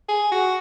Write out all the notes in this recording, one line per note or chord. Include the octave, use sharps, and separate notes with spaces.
G#4
F#4